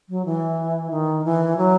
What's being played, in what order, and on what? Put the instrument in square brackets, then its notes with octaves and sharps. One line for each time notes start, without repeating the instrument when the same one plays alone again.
[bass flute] F#3
E3
D#3
E3
F#3